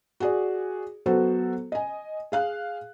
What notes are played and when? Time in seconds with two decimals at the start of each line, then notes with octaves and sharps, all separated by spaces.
0.20 F#4 G#4 D5
1.06 F#3 B3 F#4 A4 C5
1.72 D#5 G#5
2.32 G#4 F5 F#6